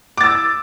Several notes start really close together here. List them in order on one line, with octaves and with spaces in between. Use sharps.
D6 A6 E6